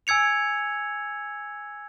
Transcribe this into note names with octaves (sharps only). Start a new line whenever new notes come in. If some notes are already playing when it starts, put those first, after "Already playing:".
G#5 E6 G#6 C#7 F7